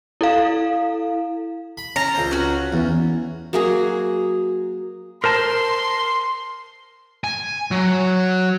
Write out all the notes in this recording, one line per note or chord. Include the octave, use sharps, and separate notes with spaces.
E4 A4 F5
B5
C#4 A5 A#5 C6
C#2 C5
C#4 F#4
E2
F#3 A#3 G#4
A#4 C5 A5 C6
G#5
F#3